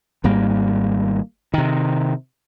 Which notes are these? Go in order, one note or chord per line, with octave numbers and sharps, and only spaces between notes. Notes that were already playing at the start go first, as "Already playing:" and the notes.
G#1 G#2 G3 A#3
C3 D#3